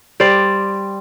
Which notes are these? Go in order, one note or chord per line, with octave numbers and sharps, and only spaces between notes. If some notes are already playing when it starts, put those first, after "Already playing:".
G3 C5 D5